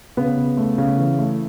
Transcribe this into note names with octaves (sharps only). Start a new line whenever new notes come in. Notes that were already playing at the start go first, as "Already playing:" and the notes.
C#3 B3
C#3
A3
C#3
E3
A3